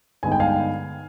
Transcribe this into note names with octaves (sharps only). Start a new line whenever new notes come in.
G2 D3 G#3 B3 D#4 G#5
G5
F5 G#5